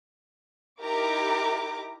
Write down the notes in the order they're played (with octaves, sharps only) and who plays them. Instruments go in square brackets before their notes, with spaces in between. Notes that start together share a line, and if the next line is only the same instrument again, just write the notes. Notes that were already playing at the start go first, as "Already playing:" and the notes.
[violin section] D#4 E4 G4 A#4 A#5 D6